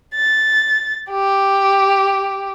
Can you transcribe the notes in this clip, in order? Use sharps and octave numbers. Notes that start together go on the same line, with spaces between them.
A6
G4